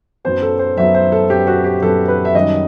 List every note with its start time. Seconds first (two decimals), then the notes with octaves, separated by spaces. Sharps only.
0.24 F#2 F#3 B3 C5
0.42 A4
0.59 C5
0.77 F#2 F#3 B3 E5
0.95 C5
1.12 A4
1.30 F#2 F#3 B3 G4
1.47 F#4
1.64 G4
1.82 F#2 F#3 B3 A4
2.08 B4
2.25 E5
2.35 F#2 D#3 G3 D#5